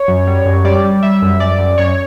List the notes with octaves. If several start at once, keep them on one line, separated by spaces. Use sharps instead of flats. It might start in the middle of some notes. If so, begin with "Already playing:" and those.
Already playing: C#5
F#2
G3
F#2
G3 D5
G3
G3 E5
F#2
F#2 D5
F#2
F#2 C#5